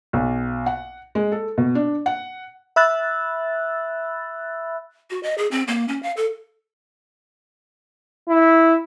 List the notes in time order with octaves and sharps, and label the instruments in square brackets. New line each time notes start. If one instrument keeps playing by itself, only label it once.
[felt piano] B1
F#5
G#3
A4
B2
D4
F#5
[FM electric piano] E5 B5 E6 F#6 A6
[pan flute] F#4
D#5
G#4
C4
A#3
C#4
F5
A4
[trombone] E4